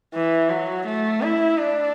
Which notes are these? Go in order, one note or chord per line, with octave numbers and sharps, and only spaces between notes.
E3
F#3
A3
E4
D4